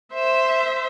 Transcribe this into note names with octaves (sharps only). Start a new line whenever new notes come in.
C5 E5